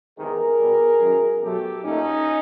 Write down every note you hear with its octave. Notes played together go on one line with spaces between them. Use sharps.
E2 C3 D#3 G#3 G#4 A#4
B2 G3
F#2 D#3 G#3
B2 F#3 A3 G4 A4
A#2 F#3 A3 C#4 D#4